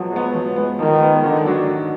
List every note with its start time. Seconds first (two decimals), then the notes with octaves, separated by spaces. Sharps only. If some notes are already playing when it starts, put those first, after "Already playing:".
Already playing: F3 F#3 G#3 B3
0.12 G#3 B3
0.35 F3
0.56 G#3 B3
0.79 D#3 F3
1.01 G#3 B3
1.24 D3 D#3
1.45 F#3 D4 F#4
1.67 D#3